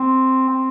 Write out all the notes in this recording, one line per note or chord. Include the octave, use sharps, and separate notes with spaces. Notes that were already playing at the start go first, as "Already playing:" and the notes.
Already playing: C4
C4